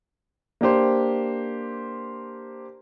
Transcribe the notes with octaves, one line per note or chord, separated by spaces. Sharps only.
A#3 D4 G4 C5